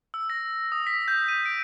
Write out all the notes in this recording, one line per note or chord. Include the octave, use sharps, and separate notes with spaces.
E6
A#6
D#6
B6
G6
D#7
D7